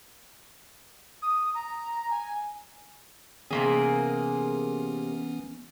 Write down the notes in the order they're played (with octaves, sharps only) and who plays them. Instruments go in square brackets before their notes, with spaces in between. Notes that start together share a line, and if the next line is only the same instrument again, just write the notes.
[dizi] D#6
A#5
G#5
[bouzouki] C3 A#3 G#4 [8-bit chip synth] E3 B3 C#4